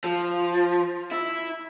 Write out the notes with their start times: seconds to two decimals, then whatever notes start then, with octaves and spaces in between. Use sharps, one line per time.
0.04 F3
1.12 E4